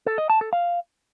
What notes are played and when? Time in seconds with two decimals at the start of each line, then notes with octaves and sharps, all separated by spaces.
0.06 A4
0.18 D#5
0.30 A5
0.41 A4
0.53 F5